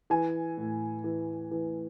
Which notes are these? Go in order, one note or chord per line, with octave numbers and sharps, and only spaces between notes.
E3 G#5
A2
E3
E3